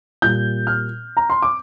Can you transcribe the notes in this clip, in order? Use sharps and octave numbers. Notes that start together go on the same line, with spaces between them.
A#2 G3 G6
F6
A#5
C6
D6